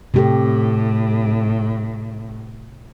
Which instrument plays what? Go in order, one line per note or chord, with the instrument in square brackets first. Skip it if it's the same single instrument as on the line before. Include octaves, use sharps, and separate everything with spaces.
[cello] A2 [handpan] C3 G4 A4